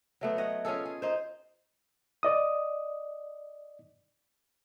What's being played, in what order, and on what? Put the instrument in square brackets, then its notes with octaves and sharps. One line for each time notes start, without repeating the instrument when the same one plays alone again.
[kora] F#3 A3 B3
C#5 D#5 F#5
C#4 F4 G#4 A4
G#4
D#4 C5
[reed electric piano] D5 D#5 D#6